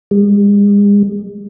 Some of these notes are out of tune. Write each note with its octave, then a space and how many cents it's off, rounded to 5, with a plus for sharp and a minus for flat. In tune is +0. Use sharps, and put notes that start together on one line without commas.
G#3 -40